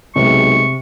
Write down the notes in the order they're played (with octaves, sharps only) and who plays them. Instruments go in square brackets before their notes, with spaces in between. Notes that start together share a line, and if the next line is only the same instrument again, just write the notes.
[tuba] B1 [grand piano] C3 [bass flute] G#3 [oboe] C#6